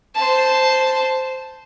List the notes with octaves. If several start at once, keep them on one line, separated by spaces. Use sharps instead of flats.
C5 A5